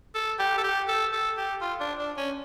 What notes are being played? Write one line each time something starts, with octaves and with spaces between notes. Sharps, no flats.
A4
G4
A4
G4
A4
A4
G4
F4
D4
D4
C#4